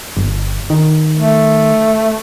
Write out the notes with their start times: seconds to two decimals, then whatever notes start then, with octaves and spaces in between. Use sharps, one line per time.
0.17 G1
0.70 D#3
1.16 A3